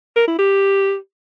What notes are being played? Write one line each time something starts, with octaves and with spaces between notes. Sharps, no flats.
A#4
E4
G4